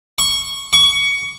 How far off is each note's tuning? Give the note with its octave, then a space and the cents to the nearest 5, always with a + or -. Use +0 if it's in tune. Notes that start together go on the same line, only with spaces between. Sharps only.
C#6 -10
C#6 +20